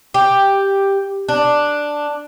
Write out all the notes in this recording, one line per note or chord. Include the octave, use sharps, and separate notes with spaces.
G4
D4